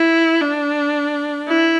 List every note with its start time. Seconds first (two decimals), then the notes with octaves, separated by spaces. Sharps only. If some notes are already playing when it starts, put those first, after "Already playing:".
Already playing: E4
0.41 D4
1.48 E4